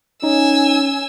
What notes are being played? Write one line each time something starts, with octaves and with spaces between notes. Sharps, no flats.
C#4 D#4 G#5 E6